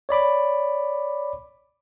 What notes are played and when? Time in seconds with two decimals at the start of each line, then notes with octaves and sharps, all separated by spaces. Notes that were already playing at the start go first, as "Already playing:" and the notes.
0.09 C#5 D5 B5 D6